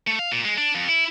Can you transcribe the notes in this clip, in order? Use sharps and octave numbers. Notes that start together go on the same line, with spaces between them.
A3
F5
A#2
G#3
D4
F2
E4